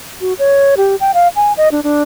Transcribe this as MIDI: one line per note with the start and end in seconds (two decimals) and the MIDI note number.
0.21 0.33 66
0.39 0.75 73
0.77 0.96 67
1.00 1.12 79
1.14 1.28 77
1.36 1.53 80
1.57 1.69 75
1.72 1.83 62
1.83 2.03 62